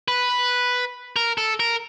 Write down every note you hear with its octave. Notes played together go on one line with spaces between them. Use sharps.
B4
A#4
A4
A#4